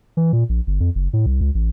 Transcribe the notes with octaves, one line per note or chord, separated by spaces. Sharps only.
E3
A#2
A#1
G1
F2
F#1
A2
C2
C#2
A1